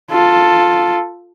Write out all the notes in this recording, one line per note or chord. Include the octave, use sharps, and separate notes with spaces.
F4 A4